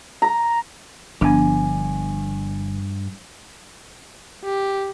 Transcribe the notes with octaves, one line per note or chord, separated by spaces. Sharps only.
A#5
G1 G2 F3 B3 D4 G#5
G4